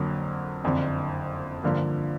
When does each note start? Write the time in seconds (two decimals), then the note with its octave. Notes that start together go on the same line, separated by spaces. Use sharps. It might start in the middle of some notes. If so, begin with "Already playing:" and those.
Already playing: F2 D3 F#3 A#3
0.64 F#1 F2 D3
1.64 G2 D3 F3 A#3